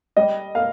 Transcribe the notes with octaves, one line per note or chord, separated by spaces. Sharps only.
G3 D#5
A#3 F5